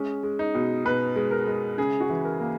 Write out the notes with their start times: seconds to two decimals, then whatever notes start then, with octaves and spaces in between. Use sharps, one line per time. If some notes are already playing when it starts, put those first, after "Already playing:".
Already playing: G#3 C#4
0.23 G#3
0.39 D#4
0.55 B2
0.85 B2 B4
1.16 G#3
1.31 A#4
1.47 G#3
1.78 C#3 G#4
2.01 F#4
2.09 E3
2.24 A#4
2.40 A#3